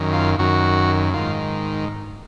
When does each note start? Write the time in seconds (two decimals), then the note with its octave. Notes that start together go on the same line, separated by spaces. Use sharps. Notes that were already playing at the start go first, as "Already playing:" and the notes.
Already playing: F#2 D#3
0.13 F4
0.39 F#2 D#3 F#4
1.14 G#2 D#3 F4